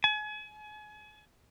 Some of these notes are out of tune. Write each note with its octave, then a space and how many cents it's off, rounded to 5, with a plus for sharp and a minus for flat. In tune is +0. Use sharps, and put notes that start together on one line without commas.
G#5 +35